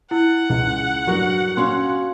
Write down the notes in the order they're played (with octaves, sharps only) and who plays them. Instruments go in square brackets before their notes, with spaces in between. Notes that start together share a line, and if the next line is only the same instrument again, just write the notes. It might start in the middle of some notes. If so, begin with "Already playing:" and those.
[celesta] E4 [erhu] F#5
[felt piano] C#2
[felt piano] G2 F#3 [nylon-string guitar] F#4 A#4
[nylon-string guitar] C#4 F#4 F5 [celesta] C6